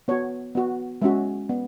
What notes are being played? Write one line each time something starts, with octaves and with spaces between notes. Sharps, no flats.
B3 F#4 C#5
B3 F#4
G#3 C#4 F#4 E5
B3